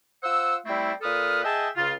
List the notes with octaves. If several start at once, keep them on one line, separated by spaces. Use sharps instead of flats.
F4 C5 F#5 E6
G3 A3 C4 E4
A#2 A4 B4 D#6 F6
G#4 D#5 E5 G5 A5
C#2 C#3 F4